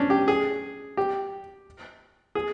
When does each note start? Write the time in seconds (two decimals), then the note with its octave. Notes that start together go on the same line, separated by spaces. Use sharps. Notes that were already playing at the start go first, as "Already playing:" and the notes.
Already playing: C#4 D4
0.10 G4
0.28 G#4
0.97 G4
2.35 G#4